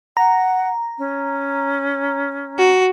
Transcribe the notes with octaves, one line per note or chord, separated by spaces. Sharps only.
F#5 A#5
C#4
F#4